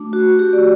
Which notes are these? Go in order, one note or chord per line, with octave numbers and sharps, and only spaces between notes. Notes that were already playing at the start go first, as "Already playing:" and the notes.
Already playing: A3 D4 F#4
F#4
G4
D5